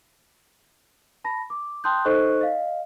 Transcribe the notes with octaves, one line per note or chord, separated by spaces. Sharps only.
A5 B5 A#6
D6
G5 A5 C6 D#6 F#6 G6
D#4 A4 C5 D#5 C#6 F#6
D#5 F5